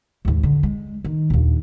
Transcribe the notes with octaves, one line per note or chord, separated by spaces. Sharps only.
D#2 G#2
D3
G#3
D#3
A#1 D#2